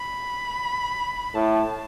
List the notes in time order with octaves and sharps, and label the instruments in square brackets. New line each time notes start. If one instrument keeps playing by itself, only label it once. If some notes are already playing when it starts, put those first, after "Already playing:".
Already playing: [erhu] B5
[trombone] A2 [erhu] A5